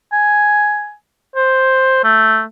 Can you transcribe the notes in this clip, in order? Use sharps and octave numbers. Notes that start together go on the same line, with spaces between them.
G#5
C5
A3